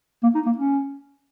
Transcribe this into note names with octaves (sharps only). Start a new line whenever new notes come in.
A#3
D#4
A#3
C#4